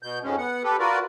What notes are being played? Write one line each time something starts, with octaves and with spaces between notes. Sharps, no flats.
B2 G6
F2 G#2 G#3 C#4
B3 F#5
G4 A4 B4
F4 F#4 A#4 B4 D5